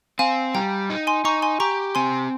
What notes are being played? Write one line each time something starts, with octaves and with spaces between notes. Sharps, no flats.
C4 F5 G#5
G3 G5 A#5
D#4
G#5 C6
D#4 A#5 C#6
G#5 C6
G4 A#5 C#6
C4 G#5 C6